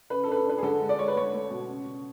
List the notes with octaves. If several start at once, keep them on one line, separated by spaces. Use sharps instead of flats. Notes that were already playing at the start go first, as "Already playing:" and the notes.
C#3 B4
A4
D4 B4
A4
D4 B4
G#4
D3 A4
G#3
D5
G#3 C#5
B4
A3 C#5
A3
B2
C#3
C#3